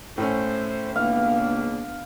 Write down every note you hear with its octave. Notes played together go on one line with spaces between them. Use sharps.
A2 A3 C#4 C5
C#2 A#3 B3 D4 F5